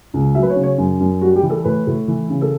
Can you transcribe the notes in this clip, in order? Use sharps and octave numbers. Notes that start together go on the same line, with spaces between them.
C#2
F#3 E5
B4
C#5
C#3
C#5
F#2
F#2
G3 F#4
G4
E3
A4
A2 B4
A2
E3
C#3
A4